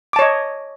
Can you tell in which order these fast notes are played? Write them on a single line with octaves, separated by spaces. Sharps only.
D6 A5 C#5 D#5